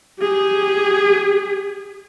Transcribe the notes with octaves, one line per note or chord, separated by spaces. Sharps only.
G4 G#4